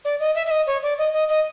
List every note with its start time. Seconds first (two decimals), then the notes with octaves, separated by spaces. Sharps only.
0.05 D5
0.20 D#5
0.35 E5
0.46 E5
0.50 D#5
0.67 C#5
0.83 D5
0.98 D#5
1.13 D#5
1.29 D#5